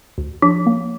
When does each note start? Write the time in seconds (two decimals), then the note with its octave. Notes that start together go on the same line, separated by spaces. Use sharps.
0.18 D2
0.42 F3 D4
0.66 A#3